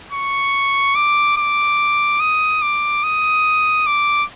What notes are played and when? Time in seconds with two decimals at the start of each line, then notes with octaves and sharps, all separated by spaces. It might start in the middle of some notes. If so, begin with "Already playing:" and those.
0.12 C#6
0.95 D6
1.37 D6
2.20 D#6
2.62 D6
3.03 D#6
3.86 D6